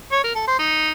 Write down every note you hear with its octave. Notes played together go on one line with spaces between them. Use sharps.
C#5
A#4
A4
C5
D#4